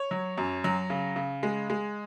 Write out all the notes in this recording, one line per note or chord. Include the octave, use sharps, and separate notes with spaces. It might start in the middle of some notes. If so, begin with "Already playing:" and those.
Already playing: C#5
F#3
F#2
F#3
C#3
C#3
G#3
G#3